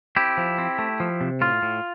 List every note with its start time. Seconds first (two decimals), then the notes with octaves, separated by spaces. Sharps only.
0.16 C4 E4 G4
0.37 F3
0.58 C4
0.79 A3
1.00 F3
1.21 C3
1.41 A2 F4
1.62 A2